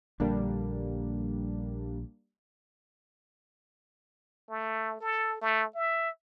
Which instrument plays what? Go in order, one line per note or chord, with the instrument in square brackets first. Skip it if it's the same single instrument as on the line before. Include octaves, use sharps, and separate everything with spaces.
[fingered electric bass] A#1 D3 [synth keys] G3 A#3 D4
[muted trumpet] A3
A4
A3
E5